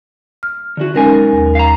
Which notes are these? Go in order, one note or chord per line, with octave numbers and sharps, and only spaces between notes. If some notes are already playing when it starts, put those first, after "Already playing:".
F6
D3 F#4
B1 G#3 C#4 D#4 A#4 G#5
D#2
F5 A#5